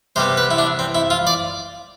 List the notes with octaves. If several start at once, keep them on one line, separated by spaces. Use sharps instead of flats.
C3 G3 B3 C5
B4
E4
D4
C4
E4
F4
D5